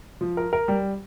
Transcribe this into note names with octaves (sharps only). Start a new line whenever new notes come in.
F3
A#4
A#4
G3